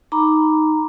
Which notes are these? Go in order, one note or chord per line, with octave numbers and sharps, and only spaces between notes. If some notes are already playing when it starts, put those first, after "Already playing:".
D#4 A#5 B5 D6